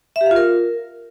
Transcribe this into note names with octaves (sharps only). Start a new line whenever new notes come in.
E5
G4
F5
F4
A#4